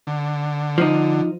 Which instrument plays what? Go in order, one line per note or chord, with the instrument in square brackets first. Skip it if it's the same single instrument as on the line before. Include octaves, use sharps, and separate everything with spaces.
[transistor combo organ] D3
[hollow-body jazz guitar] F3 D#4